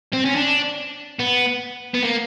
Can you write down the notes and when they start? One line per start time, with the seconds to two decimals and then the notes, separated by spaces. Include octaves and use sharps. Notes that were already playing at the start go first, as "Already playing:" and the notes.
0.13 C4
0.25 C#4
0.36 D4
1.20 B3
1.94 B3
2.03 A#3